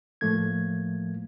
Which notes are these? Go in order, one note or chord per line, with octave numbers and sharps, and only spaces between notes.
A2 F3 A3 A#3 G#6